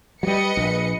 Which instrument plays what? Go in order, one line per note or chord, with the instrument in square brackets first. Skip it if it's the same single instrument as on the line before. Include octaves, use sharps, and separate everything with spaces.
[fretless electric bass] F#3 G3 [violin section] B4 D#5 C#7
[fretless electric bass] A#1